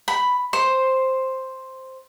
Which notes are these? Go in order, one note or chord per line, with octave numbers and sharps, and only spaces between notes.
B5
C5